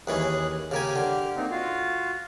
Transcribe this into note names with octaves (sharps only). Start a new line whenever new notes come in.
D#2 E3 C#4 G#4 F#6
C#3 A#3 G4 G#5 F6
D3
A#3 C4 D#4
F4 F#4 F5